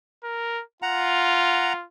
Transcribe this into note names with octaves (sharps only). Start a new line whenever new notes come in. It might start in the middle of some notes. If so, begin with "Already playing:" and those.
A#4
F4 F#5 A#5